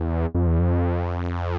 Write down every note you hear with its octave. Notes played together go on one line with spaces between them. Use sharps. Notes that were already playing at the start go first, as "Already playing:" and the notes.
Already playing: E2
F2
E2
F2